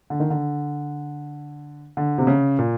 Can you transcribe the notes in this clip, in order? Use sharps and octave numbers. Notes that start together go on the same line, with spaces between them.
D3
D#3
D3
D3
C3
C#3
A#2